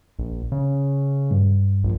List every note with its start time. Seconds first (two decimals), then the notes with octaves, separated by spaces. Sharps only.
0.19 A#1
0.52 C#3
1.31 G2
1.84 A#1